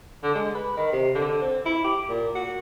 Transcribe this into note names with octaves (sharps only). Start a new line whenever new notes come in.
D3
G#3
B4
D#3
C3
D3
C4
E4
G4
A#2
F#4